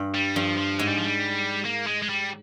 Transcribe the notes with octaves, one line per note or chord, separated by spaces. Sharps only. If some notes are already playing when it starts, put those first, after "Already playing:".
Already playing: G2
G3
G2 F3
F3
G#2 G#3
G3
F3
G3
A#3
G#3
G#3
G3